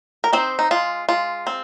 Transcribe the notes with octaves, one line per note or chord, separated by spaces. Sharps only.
A#4
C4 D#4 C5
D#4
G#3 F4
G#3 F4
C4